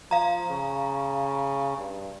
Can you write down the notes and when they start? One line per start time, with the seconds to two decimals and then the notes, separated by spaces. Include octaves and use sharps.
0.11 F3 F5 A#5
0.51 C#3
1.78 G2